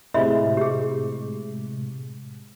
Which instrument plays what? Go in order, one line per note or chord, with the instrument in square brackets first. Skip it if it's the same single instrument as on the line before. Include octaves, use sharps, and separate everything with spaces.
[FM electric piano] A2 C3 G#3 [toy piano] E5 B5 C6
[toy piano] G4 G#4